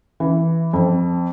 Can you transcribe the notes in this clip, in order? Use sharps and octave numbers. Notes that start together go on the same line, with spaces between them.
E3
F2